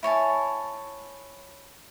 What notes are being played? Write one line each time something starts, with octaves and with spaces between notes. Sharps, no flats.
E4 C#5 G#5 A5